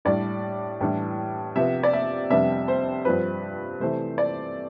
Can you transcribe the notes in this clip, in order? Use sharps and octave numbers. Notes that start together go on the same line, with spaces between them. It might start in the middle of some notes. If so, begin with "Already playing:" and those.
A2 G3 D4 D5
A2 E3 G3 D4
C3 F3 B3 E5
D5
E5
F2 C3 G3 B3 D4 E5
C5
G2 F3 C4 B4
C3 E3 A3 C5
D5